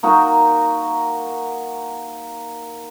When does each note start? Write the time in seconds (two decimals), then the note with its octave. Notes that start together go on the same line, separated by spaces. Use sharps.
0.03 A#3 D#4 F#4 A#4